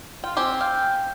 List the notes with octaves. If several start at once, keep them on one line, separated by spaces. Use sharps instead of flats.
F4 G5
C4 G4 C5 G#5
F5 G5